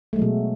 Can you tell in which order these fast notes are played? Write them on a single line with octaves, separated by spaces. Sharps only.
A3 G#3 F#3 B2